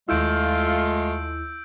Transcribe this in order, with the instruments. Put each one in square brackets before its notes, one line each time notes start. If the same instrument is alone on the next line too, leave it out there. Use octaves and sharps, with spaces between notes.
[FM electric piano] D#2 E4 [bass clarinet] G#3 [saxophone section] A3 F4 [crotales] E6 G6 D7